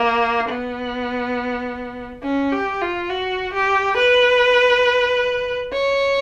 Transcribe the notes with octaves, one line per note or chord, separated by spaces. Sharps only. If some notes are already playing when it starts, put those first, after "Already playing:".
Already playing: A#3
B3
C#4
G4
F4
F#4
G4
B4
C#5